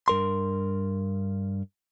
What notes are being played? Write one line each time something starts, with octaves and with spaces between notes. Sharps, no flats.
G2 A#4 C6